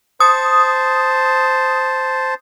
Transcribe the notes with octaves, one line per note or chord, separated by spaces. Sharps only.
C5 A5 D#6